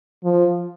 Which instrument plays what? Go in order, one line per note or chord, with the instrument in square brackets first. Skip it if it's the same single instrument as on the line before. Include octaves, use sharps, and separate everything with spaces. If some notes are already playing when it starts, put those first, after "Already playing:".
[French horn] F3